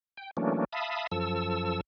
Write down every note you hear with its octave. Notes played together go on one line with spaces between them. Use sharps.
G5
E3 F#3 A3 A#3 C#4 D4
E5 F5 A5 B5 D#6
F#2 F3 A4 E6